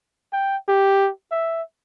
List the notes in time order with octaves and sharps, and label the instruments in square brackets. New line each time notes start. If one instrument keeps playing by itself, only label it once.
[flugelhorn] G5
G4
E5